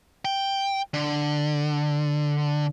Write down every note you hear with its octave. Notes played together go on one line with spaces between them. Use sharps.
G5
D3